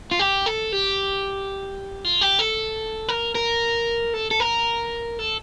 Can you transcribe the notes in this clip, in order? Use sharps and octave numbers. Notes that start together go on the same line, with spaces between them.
F4
G4
A4
G4
F4
G4
A4
A#4
A#4
A4
A4
A#4
A4